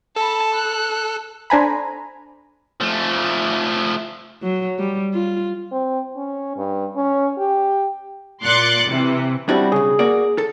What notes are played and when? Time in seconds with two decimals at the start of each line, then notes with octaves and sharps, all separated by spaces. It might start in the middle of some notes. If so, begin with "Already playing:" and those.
0.16 A4 A5 B5
0.54 F#6
1.50 D4 A4 C5 G#5 A#5 B5
2.80 F3 A3
4.43 F#3
4.79 G3
5.14 F4
5.72 C4
6.16 C#4
6.57 G2
6.96 C#4
7.38 G4
8.43 A#2 C6 D6 F#6 A6 C#7
8.87 C3 E3
9.49 G3 C4 D4 E4 F#4
9.72 B1 C#3 G#4
9.99 A#3 F#4 D5
10.38 A4